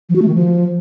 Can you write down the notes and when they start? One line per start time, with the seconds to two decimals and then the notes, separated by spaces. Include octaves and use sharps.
0.09 F3
0.16 F#4
0.22 A3
0.28 D#3
0.34 F3